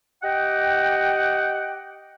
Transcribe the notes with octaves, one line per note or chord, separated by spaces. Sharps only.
G4 D#5 F#5 G5